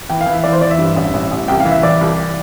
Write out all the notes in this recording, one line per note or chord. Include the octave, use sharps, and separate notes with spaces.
E3 G5
F5
E3
E5
E3 D5
C5
E3 D5
E5
G2
A1
A1
A1
C2 G5
F5
E3
E5
E3 D5
C2